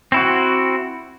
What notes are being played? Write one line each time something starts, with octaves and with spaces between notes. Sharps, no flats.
C4 E4 F#4